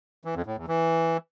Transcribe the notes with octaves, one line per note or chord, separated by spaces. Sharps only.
E3
F2
A2
E2
E3